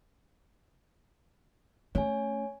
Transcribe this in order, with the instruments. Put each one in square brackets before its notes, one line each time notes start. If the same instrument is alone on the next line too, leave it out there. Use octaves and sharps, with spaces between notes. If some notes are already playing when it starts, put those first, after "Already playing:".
[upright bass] A3 C#4 [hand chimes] C#5 G#5